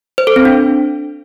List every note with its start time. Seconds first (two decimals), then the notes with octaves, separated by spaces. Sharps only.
0.18 C5
0.27 A4
0.36 C4
0.45 D4